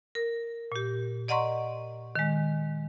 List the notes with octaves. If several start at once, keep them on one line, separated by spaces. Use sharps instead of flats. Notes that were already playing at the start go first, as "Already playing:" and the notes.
A#4
A#2 G4
D5 D#5 F#5 A#5 C6 C#6
D#3 G#3